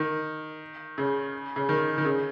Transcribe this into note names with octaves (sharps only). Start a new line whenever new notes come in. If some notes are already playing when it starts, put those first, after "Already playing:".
Already playing: D#3
C#3
C#3
D#3
D#3
C#3